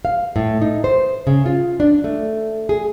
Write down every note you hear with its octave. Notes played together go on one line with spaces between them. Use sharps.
F5
A2
D#4
C5
C#3
F4
D4
A3
G#4